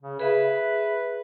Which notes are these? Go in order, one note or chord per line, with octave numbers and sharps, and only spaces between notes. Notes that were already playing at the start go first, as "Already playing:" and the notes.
C#3
G#4 B4 E5